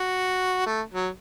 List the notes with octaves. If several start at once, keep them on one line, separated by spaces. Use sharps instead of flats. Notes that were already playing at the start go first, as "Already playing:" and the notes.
Already playing: F#4
A3
F#3